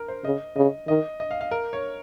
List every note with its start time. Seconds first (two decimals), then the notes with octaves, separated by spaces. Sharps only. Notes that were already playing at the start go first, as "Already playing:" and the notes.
Already playing: A#4
0.08 C5
0.24 C#3 D#5
0.56 C#3 D#5
0.87 D#3 D#5
1.20 D#5
1.31 F5
1.41 F5
1.51 A#4
1.73 C#5